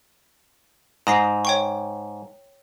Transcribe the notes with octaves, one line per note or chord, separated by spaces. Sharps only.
G#2 D#6 A#6 C7
C#5 G5 C#6